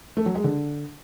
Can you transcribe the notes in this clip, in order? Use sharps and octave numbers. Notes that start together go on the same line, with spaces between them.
A3
F#3
G#3
D3